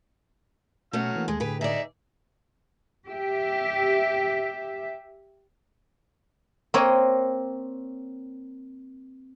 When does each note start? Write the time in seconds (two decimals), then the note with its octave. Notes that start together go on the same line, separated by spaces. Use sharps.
0.93 B2 F#3 A3 C#4 F#5 F6
1.16 E3 A#3
1.28 D#2 G#3 G#4
1.40 A2 D3 G4 G#4 B4
1.61 D#4 G#4 D5 E5
3.09 G4 E5
6.74 A#3 C4 A#4 C#5 D#5